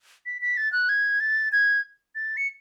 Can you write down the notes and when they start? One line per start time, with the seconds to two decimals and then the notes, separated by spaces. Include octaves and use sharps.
0.26 B6
0.42 B6
0.57 A6
0.72 F#6
0.89 G#6
1.20 A6
1.52 G#6
2.15 A6
2.37 C#7